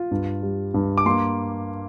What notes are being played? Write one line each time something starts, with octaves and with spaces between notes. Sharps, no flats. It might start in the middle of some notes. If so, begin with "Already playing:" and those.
Already playing: F4
G2
G3
G2
D6
A#3 C6